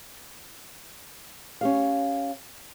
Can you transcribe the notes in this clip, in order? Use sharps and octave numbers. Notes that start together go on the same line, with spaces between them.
C#4 G4 F5